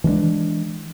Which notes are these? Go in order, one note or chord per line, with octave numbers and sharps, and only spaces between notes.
E3 G#3 B3 D4